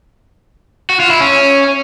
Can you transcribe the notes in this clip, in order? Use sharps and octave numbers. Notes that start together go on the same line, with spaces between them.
F#4
F4
E4
C#4